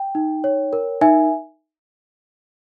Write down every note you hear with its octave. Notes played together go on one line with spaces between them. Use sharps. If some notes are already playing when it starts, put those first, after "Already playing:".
Already playing: G5
D#4
C#5
A#4
D#4 E5 G#5